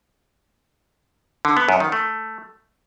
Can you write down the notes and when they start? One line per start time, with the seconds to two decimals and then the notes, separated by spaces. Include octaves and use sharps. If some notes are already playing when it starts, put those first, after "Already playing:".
1.45 D3
1.57 B3
1.69 F#2
1.80 D#3
1.92 A3